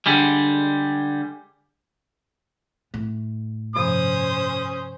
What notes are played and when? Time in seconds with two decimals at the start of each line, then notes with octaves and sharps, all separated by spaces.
0.06 D3 G3 G#3
2.94 A2
3.76 G2 C3 F3 C#4 C5 D#6